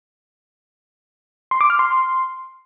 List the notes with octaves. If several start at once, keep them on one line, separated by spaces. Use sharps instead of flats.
C6
D6
F6
C6